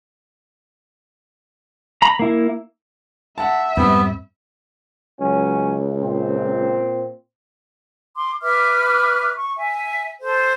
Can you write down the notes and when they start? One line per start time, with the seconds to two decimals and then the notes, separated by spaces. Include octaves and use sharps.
2.02 A#5 B5
2.19 A#3 E4
3.38 E5 F#5 A5
3.77 F2 G#2 G3 B3 C4
5.20 C#2 F#3 C#4
6.00 A#2 C4
8.16 C6 D6
8.42 B4 E5 D6 F6
9.36 C#6
9.57 E5 G#5
10.21 A4 C5